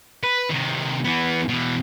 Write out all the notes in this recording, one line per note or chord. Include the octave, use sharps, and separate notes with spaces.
B4
C3 D#3
E3 B3
B2 E3